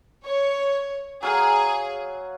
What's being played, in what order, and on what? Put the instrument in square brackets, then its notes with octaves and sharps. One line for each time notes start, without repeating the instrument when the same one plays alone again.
[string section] C#5
[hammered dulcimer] F#3 F5 [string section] G#4